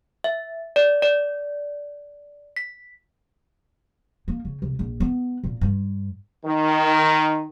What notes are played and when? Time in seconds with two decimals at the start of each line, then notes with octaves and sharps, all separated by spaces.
0.24 E5
0.76 D5
1.02 D5
2.57 B6
4.28 A#3
4.45 C#3
4.62 C2
4.79 A#1
5.00 B3
5.44 A#2
5.61 G2
6.45 D#3